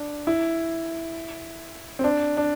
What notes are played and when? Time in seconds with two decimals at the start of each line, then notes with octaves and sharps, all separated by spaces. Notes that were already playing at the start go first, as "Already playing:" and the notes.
Already playing: D4
0.27 E4
1.99 C4
2.04 D4
2.37 D4